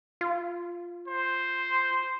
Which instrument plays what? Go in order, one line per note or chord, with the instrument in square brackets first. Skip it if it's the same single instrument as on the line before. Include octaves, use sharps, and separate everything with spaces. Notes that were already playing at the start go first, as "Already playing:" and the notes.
[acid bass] F4
[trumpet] C5